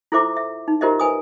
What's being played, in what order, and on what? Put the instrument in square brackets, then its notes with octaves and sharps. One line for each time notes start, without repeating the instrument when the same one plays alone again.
[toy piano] E4 F4 A4 C5 E5 D6
E5
D#4
F4 G4 A#4 C5 D#5 E5
B4 G#5 D#6